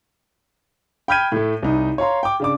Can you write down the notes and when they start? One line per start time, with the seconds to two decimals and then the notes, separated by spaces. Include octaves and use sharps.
1.08 G5 B5 F6 G6 G#6 D#7
1.32 A2 A3
1.63 C2 D#4
1.98 C#5 F5 A#5 C6
2.23 G5 D6
2.40 C#3 D4 D6